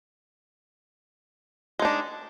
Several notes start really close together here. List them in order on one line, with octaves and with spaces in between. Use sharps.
G#3 D#4 D4